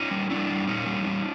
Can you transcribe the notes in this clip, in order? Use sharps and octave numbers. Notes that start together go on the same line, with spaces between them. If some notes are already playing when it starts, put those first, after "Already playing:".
Already playing: C#4 D#4
G3
G3 D4 E4
G3
A#2 C#4 D#4
G3
G3